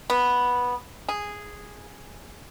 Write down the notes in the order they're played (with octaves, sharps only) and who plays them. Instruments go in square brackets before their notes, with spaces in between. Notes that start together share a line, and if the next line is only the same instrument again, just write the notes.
[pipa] B3
G#4